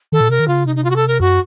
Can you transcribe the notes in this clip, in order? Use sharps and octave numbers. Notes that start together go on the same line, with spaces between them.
D#3 A4
A#2
C3 A#4
D#3
C#3 F4
C3 D#4
D#4
F4
F#4
A4
A#4
F#2 F#4